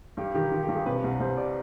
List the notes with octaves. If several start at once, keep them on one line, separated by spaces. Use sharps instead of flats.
G2 G4
D#3 G4
D#3 F4
G4
G2
G#4
C3 B4
C2
C2 C5
D5